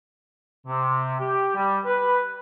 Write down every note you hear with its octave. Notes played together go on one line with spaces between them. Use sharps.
C3
G4
G3
B4